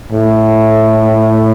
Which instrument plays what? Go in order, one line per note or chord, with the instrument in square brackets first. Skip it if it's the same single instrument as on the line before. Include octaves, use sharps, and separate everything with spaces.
[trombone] A2